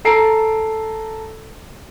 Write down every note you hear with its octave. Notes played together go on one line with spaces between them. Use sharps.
A4 A#5 C7 D7